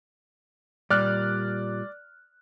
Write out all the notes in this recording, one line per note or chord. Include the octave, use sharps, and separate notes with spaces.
A#2 G3 D5 F6 F#6